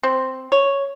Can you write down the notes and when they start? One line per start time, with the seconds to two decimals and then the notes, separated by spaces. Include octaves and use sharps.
0.03 C4
0.52 C#5